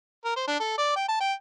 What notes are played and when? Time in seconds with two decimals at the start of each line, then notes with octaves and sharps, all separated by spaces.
0.25 A#4
0.36 C5
0.48 D4
0.60 A4
0.78 D5
0.96 G5
1.08 A5
1.20 G5